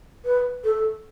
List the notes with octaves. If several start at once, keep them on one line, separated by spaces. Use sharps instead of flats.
B4
A4